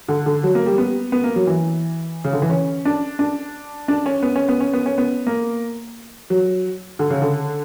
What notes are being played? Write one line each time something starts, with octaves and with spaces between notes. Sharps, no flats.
D3
D3
F#3
A#3
G3
B3
B3
A#3
F#3
E3
C#3
D3
E3
C#4
D4
D4
D4
C#4
B3
C#4
B3
C#4
B3
C#4
B3
A#3
F#3
D3
C#3
D3